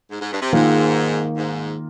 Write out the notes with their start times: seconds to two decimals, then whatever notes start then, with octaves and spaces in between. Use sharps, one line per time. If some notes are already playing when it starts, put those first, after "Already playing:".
0.11 G#2
0.21 G#2
0.32 G2
0.42 C3
0.53 G#2 D#3 A#3 F4
1.36 G#2